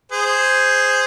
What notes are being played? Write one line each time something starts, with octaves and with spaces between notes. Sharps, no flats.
G#4 C5